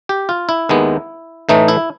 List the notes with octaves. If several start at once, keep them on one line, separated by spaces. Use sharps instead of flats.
G4
F4
E4
D#2 D#3 G#3 B3
A2 E3 A3 D#4
E4